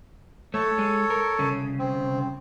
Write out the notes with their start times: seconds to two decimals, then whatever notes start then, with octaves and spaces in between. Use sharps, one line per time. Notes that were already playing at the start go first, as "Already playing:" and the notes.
0.54 A3 A4 C#5
0.79 G#3
1.10 A#4
1.39 C2 C#3
1.79 C4